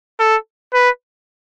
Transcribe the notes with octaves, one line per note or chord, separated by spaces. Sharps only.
A4
B4